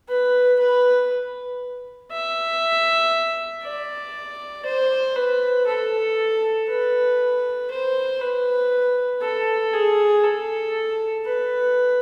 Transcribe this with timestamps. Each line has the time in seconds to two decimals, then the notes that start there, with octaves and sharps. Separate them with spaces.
0.09 B4
0.60 B4
2.12 E5
3.64 D5
4.66 C5
5.16 B4
5.67 A4
6.68 B4
7.71 C5
8.21 B4
9.22 A4
9.73 G#4
10.24 A4
11.25 B4